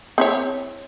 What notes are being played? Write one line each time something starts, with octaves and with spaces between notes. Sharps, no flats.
C4 E4 C#5